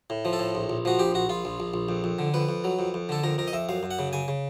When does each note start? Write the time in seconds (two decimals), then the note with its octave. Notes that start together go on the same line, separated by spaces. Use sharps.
0.10 A2
0.25 F3
0.33 A4
0.39 A2
0.55 A#1
0.69 A#1
0.85 F3 F#4
0.99 A#1 G4
1.14 A#1 F#4
1.29 A#1 F4
1.45 A#1
1.60 A#1
1.74 A#1
1.89 F2
2.04 F2
2.19 D3
2.34 F2 B4
2.49 F2
2.64 F#3
2.79 F2
2.94 F2
3.09 D3 A4
3.24 F2 A#4
3.38 F2 A#4
3.48 D#5
3.53 F2 E5
3.69 F#2 F5
3.83 F#2
3.91 F#5
3.99 C#3
4.13 C#3 G#5
4.28 C#3